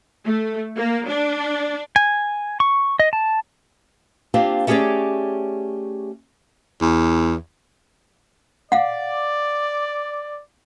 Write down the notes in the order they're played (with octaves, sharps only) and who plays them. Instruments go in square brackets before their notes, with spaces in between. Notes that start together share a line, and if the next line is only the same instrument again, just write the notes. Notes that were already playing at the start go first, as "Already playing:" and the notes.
[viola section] A3
A#3
D4
[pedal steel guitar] G#5
C#6
D#5
A5
[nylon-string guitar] A#3 C4 D4 F4 G4 C5
A3 C#4 G4 G#4 C#5 D5
[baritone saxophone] E2
[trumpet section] D5 [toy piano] F5 F#5